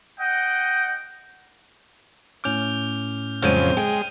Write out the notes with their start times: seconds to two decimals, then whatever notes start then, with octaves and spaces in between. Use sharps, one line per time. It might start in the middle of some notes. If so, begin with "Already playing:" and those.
0.19 D#5 F#5 G5
2.44 A2 C#4 D6 F6 G6 F7
3.42 F2 C#3 F#3 G#3 C4 F6 G6 D#7
3.77 G#3 G5